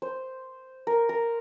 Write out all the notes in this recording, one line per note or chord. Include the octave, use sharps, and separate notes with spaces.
C5
A#4
A#4